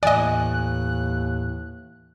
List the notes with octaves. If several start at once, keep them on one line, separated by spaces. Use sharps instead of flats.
D#2 A2 E3 D5 D#5 G#5 F#6